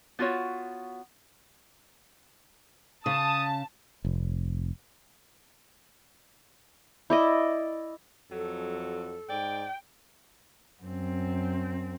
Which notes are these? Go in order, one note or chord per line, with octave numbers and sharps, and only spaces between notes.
B3 F4 F#4 C#5
C#3 A5 D#6
F1
E4 D5 D#5
F2 F#3 A4
G#2 D5 G5
F#2 C4